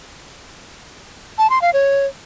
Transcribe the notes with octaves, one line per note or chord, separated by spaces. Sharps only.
A5
C6
F5
C#5